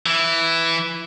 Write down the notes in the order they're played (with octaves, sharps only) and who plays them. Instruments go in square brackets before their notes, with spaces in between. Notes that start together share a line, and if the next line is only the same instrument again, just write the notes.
[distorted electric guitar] E3